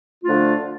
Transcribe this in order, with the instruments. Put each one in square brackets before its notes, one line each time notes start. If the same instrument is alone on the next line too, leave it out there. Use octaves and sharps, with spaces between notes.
[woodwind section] D3 F3 A3 D4 F4